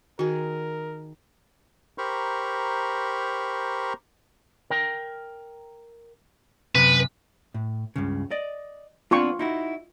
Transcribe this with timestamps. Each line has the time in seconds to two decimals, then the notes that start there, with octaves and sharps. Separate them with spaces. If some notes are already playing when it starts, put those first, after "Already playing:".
0.19 D#3 F#4 G#4 A#4
1.98 G4 A#4 C5 A#5 B5 C#6
4.70 A#4 G5
6.75 F#2 C3 B4
7.54 A2
7.96 C#2 G2 C#3
8.31 D5 D#5
9.11 B3 C4 D4 F4 C#6
9.39 D#4 E4 F#4